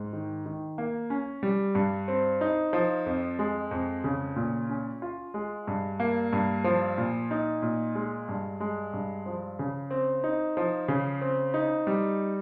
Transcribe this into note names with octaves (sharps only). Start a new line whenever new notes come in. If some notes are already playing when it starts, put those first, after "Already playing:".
Already playing: G#2
D#3
D#3
A#3
C#4
G3
G2
C4
D#4
F3
F2
G#3
F2
C#3
A#2
C#4
F4
G#3
G2
A#3
G2
F3
A#2
D#4
A#2
G#3
G2
G#3
G2
F3
C#3
C4
D#4
F3
C#3
C4
D#4
G3